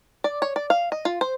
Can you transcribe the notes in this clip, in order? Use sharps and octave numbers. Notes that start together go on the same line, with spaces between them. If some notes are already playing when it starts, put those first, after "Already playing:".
D5
C#5
D5
F5
D#5
F4
C5